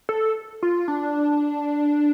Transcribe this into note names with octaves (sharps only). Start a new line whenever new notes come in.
A4
F4
D4